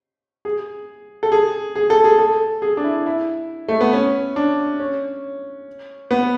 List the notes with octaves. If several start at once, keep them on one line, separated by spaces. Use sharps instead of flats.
G#4
A4
G#4
G#4
A4
G#4
A4
G#4
D4
E4
E4
A3
B3
C#4
D4
C#4
B3